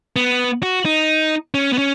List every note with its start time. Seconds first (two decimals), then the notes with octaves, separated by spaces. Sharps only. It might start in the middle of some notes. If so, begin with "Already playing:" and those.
0.16 B3
0.63 F#4
0.85 D#4
1.54 C#4
1.73 B3
1.78 C#4